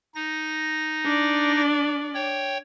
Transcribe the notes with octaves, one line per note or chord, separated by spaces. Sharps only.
D#4 A#6
D4 D5
C#5 G5